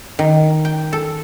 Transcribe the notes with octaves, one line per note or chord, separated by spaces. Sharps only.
D#3
G5
A4